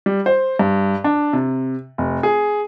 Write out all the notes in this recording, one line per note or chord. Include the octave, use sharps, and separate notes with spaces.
G3
C5
G2
D4
C3
F1
G#4